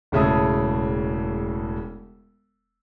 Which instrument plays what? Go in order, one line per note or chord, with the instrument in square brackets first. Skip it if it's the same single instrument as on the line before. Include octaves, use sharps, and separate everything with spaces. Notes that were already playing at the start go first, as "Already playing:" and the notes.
[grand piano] E1 A2 C#3 E5 A5 D#6